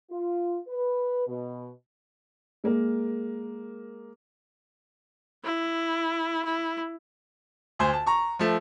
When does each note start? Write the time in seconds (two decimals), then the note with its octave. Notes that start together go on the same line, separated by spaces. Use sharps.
0.10 F4
0.68 B4
1.27 B2
2.64 G#3 A#3 A#4
5.44 E4
6.45 E4
7.79 D2 C5 G#5
7.93 A5
8.06 A#5 C#6
8.39 F3 A3